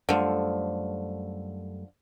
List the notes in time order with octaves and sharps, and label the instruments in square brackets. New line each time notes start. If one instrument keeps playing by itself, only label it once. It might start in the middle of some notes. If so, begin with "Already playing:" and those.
[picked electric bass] F#2 G3 A3 [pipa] D3 F3